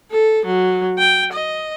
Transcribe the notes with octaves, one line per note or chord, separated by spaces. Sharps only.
A4
F#3
G5
D#5